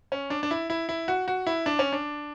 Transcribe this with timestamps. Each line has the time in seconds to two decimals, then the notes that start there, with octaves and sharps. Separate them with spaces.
0.12 C#4
0.30 D4
0.43 D4
0.51 E4
0.70 E4
0.89 E4
1.08 F#4
1.28 F#4
1.47 E4
1.66 D4
1.79 C#4
1.93 D4